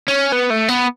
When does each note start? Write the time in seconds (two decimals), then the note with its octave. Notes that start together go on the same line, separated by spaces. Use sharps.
0.08 C#4
0.32 B3
0.50 A3
0.69 B3